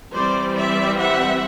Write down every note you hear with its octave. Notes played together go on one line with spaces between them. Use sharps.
E3 G3 C4 C5 D5
D5 E5
E5 F#5